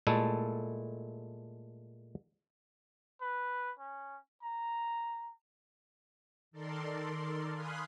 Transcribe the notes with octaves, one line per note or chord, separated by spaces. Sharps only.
A#2 G#3 A3 E4 A4
B4
C#4
A#5
D#3 A4 A#4 D5 C6
F5 G#5 B5 C6 D#6 F#6